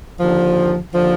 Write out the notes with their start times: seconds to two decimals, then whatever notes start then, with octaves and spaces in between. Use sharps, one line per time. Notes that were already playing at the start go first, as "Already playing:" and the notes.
0.19 D#2 D3 F3
0.91 D#2 D3 F3